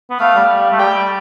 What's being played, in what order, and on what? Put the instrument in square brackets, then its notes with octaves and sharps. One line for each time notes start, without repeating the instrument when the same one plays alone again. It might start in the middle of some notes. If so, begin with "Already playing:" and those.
[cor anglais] B3
[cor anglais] A3 [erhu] F5
[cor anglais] G3
A3
[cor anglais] G3 [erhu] G5